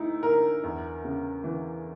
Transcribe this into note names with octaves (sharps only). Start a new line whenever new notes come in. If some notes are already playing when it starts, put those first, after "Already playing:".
Already playing: D2 D#4 E4
D3 A#4
E2
C#3
E3